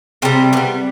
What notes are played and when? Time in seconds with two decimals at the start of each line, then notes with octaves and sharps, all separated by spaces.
0.22 C3 G3 C4
0.53 D3 G3 B3